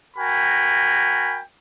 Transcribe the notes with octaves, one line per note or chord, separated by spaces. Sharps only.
F#4 A#4 G5 G#5 B5